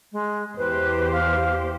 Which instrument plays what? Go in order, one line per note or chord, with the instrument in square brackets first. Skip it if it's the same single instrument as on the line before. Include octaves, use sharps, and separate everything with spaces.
[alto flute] G#3
[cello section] E2 G4 C5 [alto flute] B4
[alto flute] F5